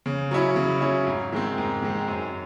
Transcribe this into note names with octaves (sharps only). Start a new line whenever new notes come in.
C#3
F#3 C#4 E4
C#3
F#3 C#4 E4
G#2
D#3 G#3 C4
G#2
D#3 G#3 C4
F#2